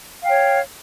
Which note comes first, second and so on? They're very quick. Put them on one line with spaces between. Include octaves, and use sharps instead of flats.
F5 G5 C#5